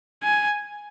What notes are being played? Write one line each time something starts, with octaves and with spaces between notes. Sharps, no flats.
G#5